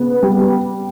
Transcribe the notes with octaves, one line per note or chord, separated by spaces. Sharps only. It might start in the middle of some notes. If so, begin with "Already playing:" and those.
Already playing: C#3 B3
G3